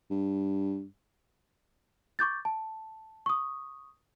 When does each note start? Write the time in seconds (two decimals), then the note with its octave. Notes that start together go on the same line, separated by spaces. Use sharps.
0.10 G2
2.19 C#6 D6 G6 A6
2.45 A5
3.26 C#6 D#6